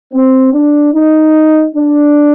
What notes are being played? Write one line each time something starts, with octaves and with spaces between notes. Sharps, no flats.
C4
D4
D#4
D4